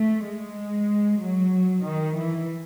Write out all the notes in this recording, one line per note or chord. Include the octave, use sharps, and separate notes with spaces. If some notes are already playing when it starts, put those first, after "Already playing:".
Already playing: A3
G#3
F#3
D#3
E3